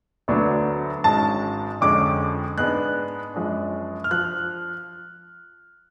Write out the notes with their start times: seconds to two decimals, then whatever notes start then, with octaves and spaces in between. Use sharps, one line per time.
0.28 D2 D3 F#3 B3 D4
1.04 G#1 G#2 G#3 C#4 A5
1.81 F2 D3 G#3 C#4 D6
2.58 G#2 G#3 B3 D4 F#6
3.34 F#2 F3 G#3 D4
4.04 F6
4.11 F3 F#6